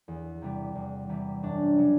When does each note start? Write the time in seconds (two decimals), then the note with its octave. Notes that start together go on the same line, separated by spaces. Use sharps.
0.08 E2
0.42 C3 E3 G3
0.75 E2
1.09 C3 E3 G3
1.43 F#2 D4
1.77 C#3 F#3